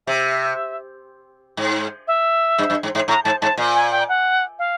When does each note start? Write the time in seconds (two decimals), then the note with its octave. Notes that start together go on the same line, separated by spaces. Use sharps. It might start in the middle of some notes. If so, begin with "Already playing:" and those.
0.07 C3 E5
1.57 G#2
2.07 E5
2.58 G2
2.70 G2
2.83 G#2
2.95 G#2
3.08 A2 A#5
3.24 G#2 A5
3.41 G#2 A5
3.58 A#2
3.75 G#5
3.91 G5
4.09 F#5
4.59 F5